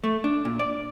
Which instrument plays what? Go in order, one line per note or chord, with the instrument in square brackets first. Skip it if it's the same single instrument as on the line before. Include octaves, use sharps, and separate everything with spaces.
[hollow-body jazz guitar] A3
D4
A#2
D5